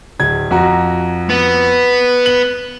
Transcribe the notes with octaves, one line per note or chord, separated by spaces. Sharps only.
D1 G#6
F2 F#4 A#5
B3
F#7